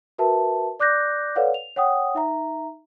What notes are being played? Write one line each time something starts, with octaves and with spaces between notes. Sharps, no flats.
F#4 A#4 B4 E5 A5
D5 D6 F#6 G6 A#6
A4 B4 C#5 D5 F5 F#5
F7
C#5 F#5 G5 D#6
D#4 E5 A#5